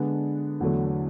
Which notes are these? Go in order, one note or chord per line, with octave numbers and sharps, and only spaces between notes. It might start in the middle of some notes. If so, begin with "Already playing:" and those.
Already playing: D3 G#3 B3 D4
E2 D3 F#3 A3